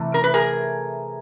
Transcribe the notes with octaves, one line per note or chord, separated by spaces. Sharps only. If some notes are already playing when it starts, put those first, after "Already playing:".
Already playing: C3 E3 A3
A#4
B4
G#4 A#4